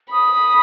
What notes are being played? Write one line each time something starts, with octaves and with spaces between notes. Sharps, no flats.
B5 D#6